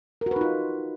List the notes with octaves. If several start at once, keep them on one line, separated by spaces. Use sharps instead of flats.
D#4 F4 F#4 A#4 B4